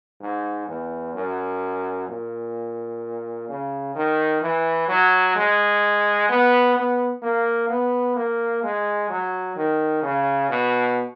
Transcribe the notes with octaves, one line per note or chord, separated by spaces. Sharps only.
G#2
E2
F#2
A#2
C#3
D#3
E3
F#3
G#3
B3
B3
A#3
B3
A#3
G#3
F#3
D#3
C#3
B2